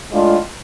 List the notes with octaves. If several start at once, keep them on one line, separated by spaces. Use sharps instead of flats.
A2 G#3 D4 F4